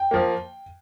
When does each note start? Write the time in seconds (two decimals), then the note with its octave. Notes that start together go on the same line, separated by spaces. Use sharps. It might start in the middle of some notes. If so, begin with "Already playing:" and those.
Already playing: G5
0.11 F3 A#3